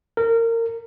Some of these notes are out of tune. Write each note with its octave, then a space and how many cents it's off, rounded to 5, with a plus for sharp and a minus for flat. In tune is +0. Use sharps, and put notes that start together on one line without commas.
A#4 -25